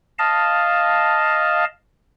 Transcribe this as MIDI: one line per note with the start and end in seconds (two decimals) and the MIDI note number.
0.19 1.65 75
0.19 1.65 77
0.19 1.65 81